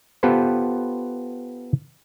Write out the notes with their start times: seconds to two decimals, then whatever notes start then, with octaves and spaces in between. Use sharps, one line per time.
0.23 B3 F4 G4 A4 B4 C5